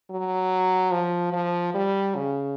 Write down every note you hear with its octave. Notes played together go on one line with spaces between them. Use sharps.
F#3
F3
F3
G3
C#3